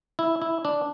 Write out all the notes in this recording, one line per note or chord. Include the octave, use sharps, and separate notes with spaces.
E4
E4
D4